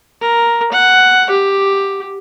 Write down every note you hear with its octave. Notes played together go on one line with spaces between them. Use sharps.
A#4
F#5
G4